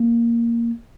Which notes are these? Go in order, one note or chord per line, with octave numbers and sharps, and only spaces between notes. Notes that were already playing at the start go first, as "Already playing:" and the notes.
Already playing: A#3